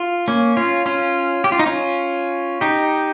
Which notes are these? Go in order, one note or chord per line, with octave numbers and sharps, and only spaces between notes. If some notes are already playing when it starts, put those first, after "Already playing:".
Already playing: F4
A#3 C#4
C#4 F4
C#4 F4
G4
F4
D#4
C#4 F4
D#4 G4